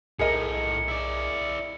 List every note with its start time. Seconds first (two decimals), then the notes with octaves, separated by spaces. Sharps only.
0.19 B1 A2 D#4 G#4 A#4 D#5 C#7
0.88 E4 D5